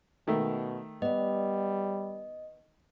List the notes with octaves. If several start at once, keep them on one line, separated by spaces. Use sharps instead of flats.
B2 D#3 A3
G3 B3 D5 D#5